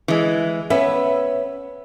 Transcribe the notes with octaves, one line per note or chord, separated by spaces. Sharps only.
E3 G#3
B3 C#4 E5